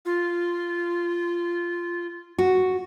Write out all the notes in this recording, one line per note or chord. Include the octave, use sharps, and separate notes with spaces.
F4
F#4